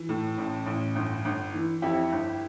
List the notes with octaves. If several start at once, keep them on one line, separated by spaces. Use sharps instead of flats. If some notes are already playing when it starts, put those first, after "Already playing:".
Already playing: E3
A2
A1
A1
G1
G1
E3
F2 E4 G4
G1